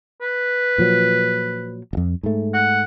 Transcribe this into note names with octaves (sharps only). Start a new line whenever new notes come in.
B4
A#2 F3 F#3
D#1 F2
G#2 A3
F#5